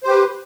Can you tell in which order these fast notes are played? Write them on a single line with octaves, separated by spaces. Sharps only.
C5 G4 B4